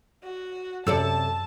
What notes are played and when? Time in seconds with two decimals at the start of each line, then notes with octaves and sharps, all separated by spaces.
0.23 F#4
0.87 F#2 C3 A4 D5 A5 E6